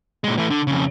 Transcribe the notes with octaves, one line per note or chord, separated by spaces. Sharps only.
A#2 G#3
E3 A3
D3
F2 C#3